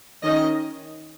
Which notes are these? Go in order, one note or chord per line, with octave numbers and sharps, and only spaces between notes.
D#3 C#4 D#5